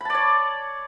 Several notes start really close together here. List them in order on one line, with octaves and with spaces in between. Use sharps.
B5 A5 D5 C#5